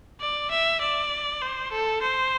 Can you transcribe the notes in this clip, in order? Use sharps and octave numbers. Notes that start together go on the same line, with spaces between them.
D5
E5
D5
C5
A4
C5